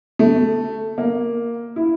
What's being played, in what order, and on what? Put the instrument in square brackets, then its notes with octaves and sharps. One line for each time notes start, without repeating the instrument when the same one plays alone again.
[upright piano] A3
A#3
E4